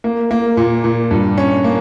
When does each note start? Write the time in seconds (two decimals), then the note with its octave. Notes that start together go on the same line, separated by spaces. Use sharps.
0.04 A#3
0.31 A#3
0.57 A#2
0.84 A#2
1.11 G2
1.38 C#4
1.64 A#3